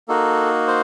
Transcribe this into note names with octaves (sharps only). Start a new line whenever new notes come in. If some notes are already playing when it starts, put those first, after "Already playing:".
A#3 D#4 F#4 A4
C5